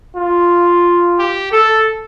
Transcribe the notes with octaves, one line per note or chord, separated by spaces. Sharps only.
F4
G4
A4